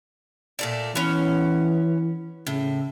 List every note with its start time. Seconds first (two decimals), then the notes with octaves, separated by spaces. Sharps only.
0.59 A#2 A3 D5
0.95 E3 B3 C#4
2.47 A2 C#3